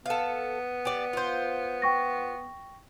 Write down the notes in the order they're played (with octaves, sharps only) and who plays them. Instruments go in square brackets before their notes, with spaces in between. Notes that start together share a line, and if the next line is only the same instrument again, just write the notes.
[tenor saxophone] B3 [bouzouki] A4 F5
[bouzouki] G4 D5
F4 C5
[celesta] G5 C#6 A#6